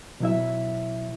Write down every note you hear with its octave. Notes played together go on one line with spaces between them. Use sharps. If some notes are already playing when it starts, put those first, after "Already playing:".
B2 F#3 E4 E5